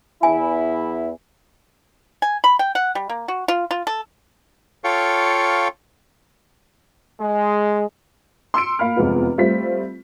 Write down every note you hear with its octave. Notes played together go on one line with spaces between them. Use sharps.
E2 E4 G#5
G#5
B5
G5
F#5
G3
A#3
F#4
F4
F4
A4
F4 A4 C#5 F5 G5 C#6
G#3
C6 E6 C#7 D7
A#3 F5 B5 F6
F1 E2 F3 G#3 B3 F4
G3 A3 C4 F4 B6